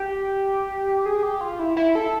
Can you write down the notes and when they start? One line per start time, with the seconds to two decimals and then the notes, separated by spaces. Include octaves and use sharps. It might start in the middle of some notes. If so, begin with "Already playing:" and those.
Already playing: G4
1.06 G#4
1.23 G4
1.41 F4
1.59 E4
1.76 E4
1.95 A4